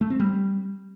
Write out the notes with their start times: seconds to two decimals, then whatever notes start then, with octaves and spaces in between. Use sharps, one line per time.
0.01 A3
0.10 C4
0.20 G3